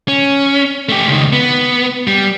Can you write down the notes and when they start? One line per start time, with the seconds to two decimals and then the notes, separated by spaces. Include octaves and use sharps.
0.08 C#4
0.89 A3 G4
1.07 C#2 D#3
1.33 B3
2.07 G3